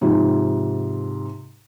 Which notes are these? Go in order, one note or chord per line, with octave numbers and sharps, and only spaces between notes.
G#2 C3 F3